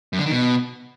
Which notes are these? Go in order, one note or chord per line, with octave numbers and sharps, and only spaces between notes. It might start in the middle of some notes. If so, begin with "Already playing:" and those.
F#2
D3
D#3
B2